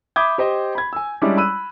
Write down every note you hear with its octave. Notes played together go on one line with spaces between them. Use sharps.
E5 B5 D6 D#6 G6 G#6
G4 C5 D#5
B5 G#6
G#5 E6
G3 G#3 C#4 D4 E4
B5 E6 F#6 D#7